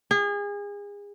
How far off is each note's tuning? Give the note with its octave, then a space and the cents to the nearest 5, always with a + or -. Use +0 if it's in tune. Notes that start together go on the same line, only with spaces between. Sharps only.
G#4 -30